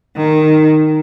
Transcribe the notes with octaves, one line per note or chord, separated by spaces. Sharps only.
D#3